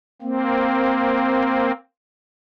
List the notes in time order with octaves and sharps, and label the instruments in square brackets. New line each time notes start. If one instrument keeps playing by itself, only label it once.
[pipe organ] A#3 C4